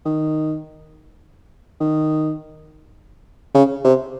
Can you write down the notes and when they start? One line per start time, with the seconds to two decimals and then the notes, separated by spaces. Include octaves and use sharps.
0.05 D#3
1.80 D#3
3.55 C#3
3.85 C3